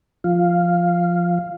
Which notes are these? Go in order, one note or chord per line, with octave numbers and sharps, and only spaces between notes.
F3 F5